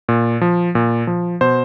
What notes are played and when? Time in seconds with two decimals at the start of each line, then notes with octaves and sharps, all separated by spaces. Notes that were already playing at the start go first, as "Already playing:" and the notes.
0.09 A#2
0.41 F3
0.75 A#2
1.07 F3
1.41 B2 C5